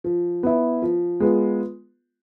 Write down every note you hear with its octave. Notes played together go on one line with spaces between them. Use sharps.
F3
B3 E4
F3
G#3 B3 F4